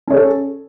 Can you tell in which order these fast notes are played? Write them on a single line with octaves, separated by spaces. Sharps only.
C#4 C#5 G#4 A4